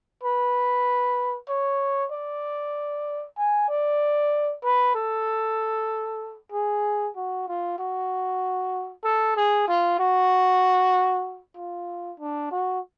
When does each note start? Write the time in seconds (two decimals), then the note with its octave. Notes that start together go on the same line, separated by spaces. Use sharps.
0.23 B4
1.49 C#5
2.12 D5
3.37 G#5
3.69 D5
4.64 B4
4.95 A4
6.52 G#4
7.16 F#4
7.48 F4
7.79 F#4
9.04 A4
9.37 G#4
9.68 F4
9.99 F#4
11.56 F4
12.20 D4
12.51 F#4